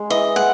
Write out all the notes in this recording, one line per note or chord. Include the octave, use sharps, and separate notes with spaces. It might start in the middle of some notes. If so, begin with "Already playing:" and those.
Already playing: G#3
E3 D#5
G#3 F#5